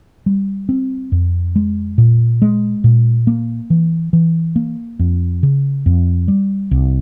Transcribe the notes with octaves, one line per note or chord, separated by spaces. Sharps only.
G3
C4
F2
G#3
A#2
G#3
A#2
A#3
E3
E3
A#3
F2
C#3
F2
G3
C2